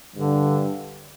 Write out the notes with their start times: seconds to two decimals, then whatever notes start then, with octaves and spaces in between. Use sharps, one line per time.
0.16 G2 D3